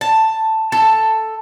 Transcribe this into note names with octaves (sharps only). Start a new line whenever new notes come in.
A5
A4